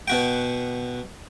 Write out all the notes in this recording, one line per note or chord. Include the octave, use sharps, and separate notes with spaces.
B2 F#4 G5